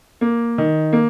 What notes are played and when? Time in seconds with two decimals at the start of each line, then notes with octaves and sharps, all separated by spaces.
0.21 A#3
0.58 D#3
0.93 A#3